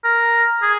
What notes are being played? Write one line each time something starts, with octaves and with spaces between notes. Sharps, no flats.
A#4
G#4